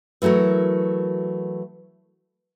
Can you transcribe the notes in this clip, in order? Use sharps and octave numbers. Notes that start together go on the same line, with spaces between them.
E3 F#3 A3 F#4 A#4